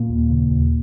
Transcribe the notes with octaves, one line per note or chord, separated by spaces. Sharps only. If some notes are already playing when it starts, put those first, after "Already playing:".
Already playing: A#2 A#3
D#2
C#3
D#2